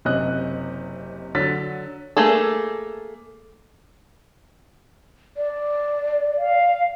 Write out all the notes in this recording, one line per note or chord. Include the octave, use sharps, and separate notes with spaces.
F#1 C3 C#4 D#5 F#6
D3 F#3 A6 B6
A3 A#3 G#4 A4
D5
F5